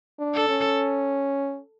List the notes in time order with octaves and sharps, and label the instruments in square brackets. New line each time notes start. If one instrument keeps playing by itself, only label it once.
[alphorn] D4
[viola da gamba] A4
[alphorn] C#4